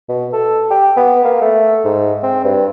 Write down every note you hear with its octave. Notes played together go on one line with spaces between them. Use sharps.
B2
A4
G4
B3
A#3
A3
G#2
C4
G2